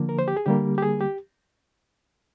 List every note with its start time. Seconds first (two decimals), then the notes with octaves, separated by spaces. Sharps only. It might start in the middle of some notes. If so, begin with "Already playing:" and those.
Already playing: D3 F3 A#3
0.09 A#4
0.19 C5
0.28 G4
0.37 G#4
0.46 D3 G3 A#3 G4
0.78 G4
0.82 G#4
1.01 G4